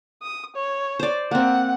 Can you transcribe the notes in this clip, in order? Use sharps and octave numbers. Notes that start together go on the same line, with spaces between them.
D#6
C#5
C5 D5
A#3 C4 F#5